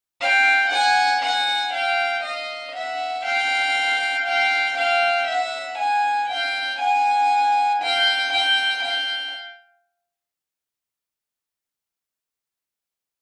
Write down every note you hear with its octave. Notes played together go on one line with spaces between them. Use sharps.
F5 G5
F#5 G#5
F#5 G#5
F5 G5
D#5 F5
E5 F#5
F5 G5
F5 G5
F5 G5
E5 F#5
F#5 G#5
F5 G5
F#5 G#5
F5 G5
F5 G5
F5 G5